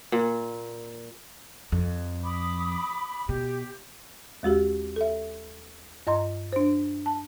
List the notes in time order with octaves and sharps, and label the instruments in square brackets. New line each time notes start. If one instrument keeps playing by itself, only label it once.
[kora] A#2
[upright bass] F2
[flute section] B5 D6 D#6
[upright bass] B2 [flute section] G4
[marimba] D#2 G#3 F#4 G4
A4 E5
G2 D#5 A#5 C6
D4 C5
A5